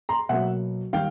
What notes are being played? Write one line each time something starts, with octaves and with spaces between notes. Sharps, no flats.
A#5 C6
B2 F#3 A#3 E5 F#5
D#3 G3 A#3 F5 G5